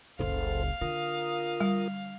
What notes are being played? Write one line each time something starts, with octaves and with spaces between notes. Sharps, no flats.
F#1 C#2 A4 C5 F5
D3 F4 A#4 D#6
G3